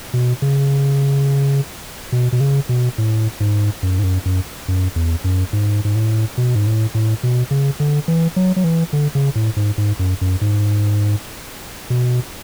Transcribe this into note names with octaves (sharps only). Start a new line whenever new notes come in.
B2
C#3
B2
B2
C#3
B2
A2
G#2
F#2
G#2
F#2
F#2
F#2
E2
F#2
G#2
G#2
A2
B2
G#2
A2
A2
B2
C#3
D3
E3
F#3
F#3
E3
D3
C#3
A2
G#2
G#2
F#2
F#2
G#2
B2